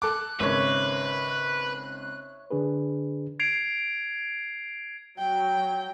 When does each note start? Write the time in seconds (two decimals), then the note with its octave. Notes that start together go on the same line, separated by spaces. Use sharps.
0.02 A4 D6 F#6
0.40 G#1 C#3 B4 C#5 E5
2.51 D3 D4 G#4 B4
3.39 G#6 C7 D7 F7
5.18 F#3 G5